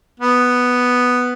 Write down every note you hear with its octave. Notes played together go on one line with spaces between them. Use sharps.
B3